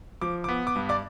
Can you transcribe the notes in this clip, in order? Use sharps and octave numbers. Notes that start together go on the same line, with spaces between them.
F3 D6
B3 D6
D6
G2
D5 D6